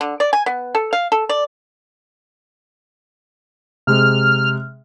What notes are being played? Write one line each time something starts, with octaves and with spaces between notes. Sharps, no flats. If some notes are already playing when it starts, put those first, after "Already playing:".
D3
D5
G#5
B3
A4
F5
A4
D5
C3 G#3 F6